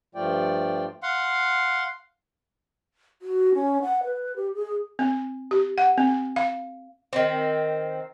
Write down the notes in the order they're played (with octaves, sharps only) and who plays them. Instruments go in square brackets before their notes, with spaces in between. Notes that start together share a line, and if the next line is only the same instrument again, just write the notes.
[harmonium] G2 F3 A3 F4 D5 G5
[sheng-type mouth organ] F5 F#5 C6
[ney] F#4
C#4
F#5
B4
G4
G#4
[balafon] C4
G4
F#5
C4
F5
[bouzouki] D#3 C4